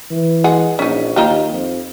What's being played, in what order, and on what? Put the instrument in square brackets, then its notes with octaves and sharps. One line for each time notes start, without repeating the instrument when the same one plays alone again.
[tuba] E3
[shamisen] G#3 G#4 F#5
[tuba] A#1 [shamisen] C#4 D#4
[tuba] D#2 [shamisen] D#4 F4 G4
[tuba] F2